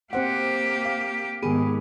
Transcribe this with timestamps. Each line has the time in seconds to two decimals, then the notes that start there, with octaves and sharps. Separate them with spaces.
0.13 A#3 C4 G4 C5 F#5
0.85 F5
1.43 G#2 D#3 B3 G4 G#4